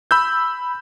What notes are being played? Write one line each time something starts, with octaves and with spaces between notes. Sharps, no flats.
B5 E6 G6